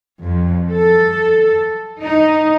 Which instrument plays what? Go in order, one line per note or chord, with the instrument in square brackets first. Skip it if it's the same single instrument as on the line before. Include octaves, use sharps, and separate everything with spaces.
[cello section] F2
A4
D#4